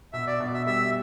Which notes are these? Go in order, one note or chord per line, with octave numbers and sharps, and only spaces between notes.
B2 E5
D5
B2
E5
G3 E5